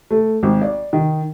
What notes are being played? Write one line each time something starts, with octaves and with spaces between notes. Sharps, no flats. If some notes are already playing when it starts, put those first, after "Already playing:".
A3
G#1
D5
D#3